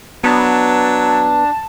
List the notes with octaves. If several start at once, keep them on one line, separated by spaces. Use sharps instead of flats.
F#3 B3 D4 A5